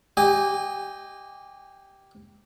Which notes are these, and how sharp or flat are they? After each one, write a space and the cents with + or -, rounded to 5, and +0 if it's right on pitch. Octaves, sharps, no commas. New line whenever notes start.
G4 -10 D#5 +0 G#5 -30